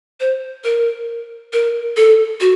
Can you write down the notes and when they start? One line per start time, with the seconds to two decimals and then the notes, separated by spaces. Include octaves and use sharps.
0.20 C5
0.64 A#4
1.53 A#4
1.97 A4
2.41 F#4